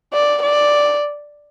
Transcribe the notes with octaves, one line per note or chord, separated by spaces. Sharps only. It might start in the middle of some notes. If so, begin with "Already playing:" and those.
D5
D5